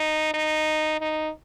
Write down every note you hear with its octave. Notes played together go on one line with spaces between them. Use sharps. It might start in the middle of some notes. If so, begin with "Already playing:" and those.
Already playing: D#4
D#4
D#4